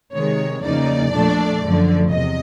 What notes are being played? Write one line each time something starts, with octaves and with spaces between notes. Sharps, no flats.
C3 D#3 G#3 C#5
E2 C#3 F3 A#3 D#4 D5
A#2 F3 A3 D4
F#2 D3 F3 A3
E2 C3 D#5